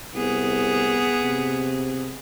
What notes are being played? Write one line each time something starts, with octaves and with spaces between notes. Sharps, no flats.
C2 B3 G#4
C3